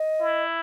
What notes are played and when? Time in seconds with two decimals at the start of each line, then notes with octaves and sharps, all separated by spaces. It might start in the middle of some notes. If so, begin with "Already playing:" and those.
Already playing: D#5
0.21 E4